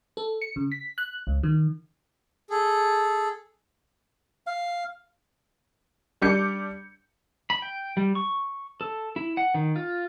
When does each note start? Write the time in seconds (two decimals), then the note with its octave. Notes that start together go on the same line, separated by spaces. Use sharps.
0.17 A4
0.42 C#7
0.56 C#3
0.72 B6
0.98 F#6
1.27 C#2
1.43 D#3
2.50 G#4 A4
4.47 F5
6.22 G3 D4 D6 G6 C#7
7.50 B5
7.62 G5
7.97 G3
8.15 C#6
8.81 A4
9.16 E4
9.37 F#5
9.54 D#3
9.76 F4